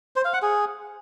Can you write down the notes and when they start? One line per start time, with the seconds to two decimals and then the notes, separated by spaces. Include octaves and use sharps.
0.16 C5
0.25 F5
0.33 F#5
0.42 G#4